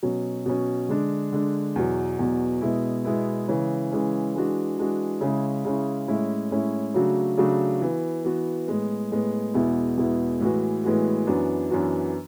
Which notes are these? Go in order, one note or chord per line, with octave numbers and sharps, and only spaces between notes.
B2 F#3 C#4
B2 F#3 C#4
D3 G#3 D4
D3 G#3 D4
E2 B2 F#3
E2 B2 F#3
B2 G#3 B3 E4
B2 G#3 B3 E4
C#3 E3 G#3 C#4
C#3 E3 G#3 C#4
E3 G#3 D4 F#4
E3 G#3 D4 F#4
C#3 G#3 C#4 E4
C#3 G#3 C#4 E4
A2 G#3 C#4 E4
A2 G#3 C#4 E4
C#3 F#3 A3 D4 F#4
C#3 F#3 A3 D4 F#4
E3 B3 F#4
E3 B3 F#4
A2 G#3 B3
A2 G#3 B3
E2 B2 G#3 B3 E4
E2 B2 G#3 B3 E4
A2 E3 G#3 B3 F#4
A2 E3 G#3 B3 F#4
F#2 E3 B3 D4 F#4
F#2 E3 B3 D4 F#4